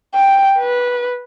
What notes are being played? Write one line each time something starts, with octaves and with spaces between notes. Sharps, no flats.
G5
B4